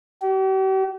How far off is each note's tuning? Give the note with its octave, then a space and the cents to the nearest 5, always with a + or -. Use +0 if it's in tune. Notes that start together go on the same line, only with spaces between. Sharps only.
G4 -45